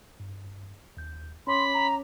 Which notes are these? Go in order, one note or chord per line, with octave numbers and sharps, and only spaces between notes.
G2
D#2 G6
C#4 C#5 B5 C6 D6
A#5